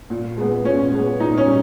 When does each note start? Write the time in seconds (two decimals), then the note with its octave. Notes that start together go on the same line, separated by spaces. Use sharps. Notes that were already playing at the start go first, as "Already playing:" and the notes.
0.10 A#2
0.37 G#3 B3
0.64 A#2 C#4
0.92 G#3 B3
1.20 A#2 D#4
1.38 C#4
1.46 G3